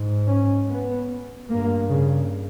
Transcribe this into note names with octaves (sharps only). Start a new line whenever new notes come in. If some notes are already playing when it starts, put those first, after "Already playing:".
Already playing: G#2
C#4
B3
G2 A#3
C#3